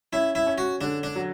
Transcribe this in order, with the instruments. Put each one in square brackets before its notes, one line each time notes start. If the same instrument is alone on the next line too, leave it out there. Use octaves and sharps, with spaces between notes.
[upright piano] C#4 [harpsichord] E4
[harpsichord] E4
[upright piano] C#4
[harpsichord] F#4
[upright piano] D3 [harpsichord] D4
[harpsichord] D4
[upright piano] F#3